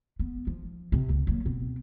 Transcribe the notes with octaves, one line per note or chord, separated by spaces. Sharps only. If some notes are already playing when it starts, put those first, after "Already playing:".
B3
F3
C3 C4
C#2
F#3 A#3
B2 C4